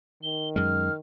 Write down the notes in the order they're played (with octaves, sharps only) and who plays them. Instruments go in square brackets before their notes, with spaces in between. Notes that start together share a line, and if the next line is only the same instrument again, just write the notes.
[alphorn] D#3 [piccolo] G7
[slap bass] F#2 G#3 [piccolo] F6